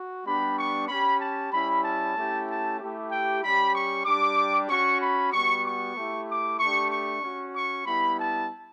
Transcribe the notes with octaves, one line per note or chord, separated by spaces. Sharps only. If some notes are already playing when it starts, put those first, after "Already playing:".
Already playing: F#4
G3 B3 D4 G4 B5
C#6
C#4 G4 B5
A5
G3 C#4 E4 B5
A5
A3 C#4 E4 G4
A5
A3 E4 G4
G5
G3 C#4 G4 B5
C#6
G3 D4 G4 D6
C#4 F#4 C#6
B5
G3 B3 F#4 C#6
C#6
A3 E4 G4
D6
A3 D4 G4 C#6
C#6
C#4 F#4
C#6
G3 B3 E4 B5
A5